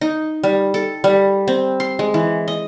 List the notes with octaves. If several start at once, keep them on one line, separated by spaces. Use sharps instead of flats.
D#4
G3
A4
G3
C4
C6
G#3
E3
D#5